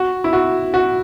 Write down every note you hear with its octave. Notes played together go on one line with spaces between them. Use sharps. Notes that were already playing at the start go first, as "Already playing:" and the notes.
Already playing: F#4
E4
F#4
F#4